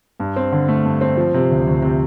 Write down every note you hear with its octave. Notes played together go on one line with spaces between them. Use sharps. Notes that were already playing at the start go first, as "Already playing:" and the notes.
G2
C4
D3
A3
G2
C4
F3
C3
D2
D2
C3